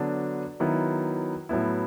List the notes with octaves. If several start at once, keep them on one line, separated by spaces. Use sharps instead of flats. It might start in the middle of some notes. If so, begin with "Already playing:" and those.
Already playing: D3 F#3 B3 D4
D#3 F#3 B3 E4
A2 F#3 B3 E4